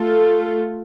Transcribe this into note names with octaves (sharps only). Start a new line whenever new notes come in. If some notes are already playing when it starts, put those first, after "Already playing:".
Already playing: A3 F4 A4